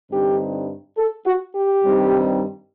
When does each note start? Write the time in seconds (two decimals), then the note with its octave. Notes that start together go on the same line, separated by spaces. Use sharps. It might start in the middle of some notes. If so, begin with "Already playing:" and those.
0.10 G2 D3 G3 C4 D#4 G4
0.97 A4
1.25 F#4
1.54 G4
1.84 G2 D#3 G3 C4 D#4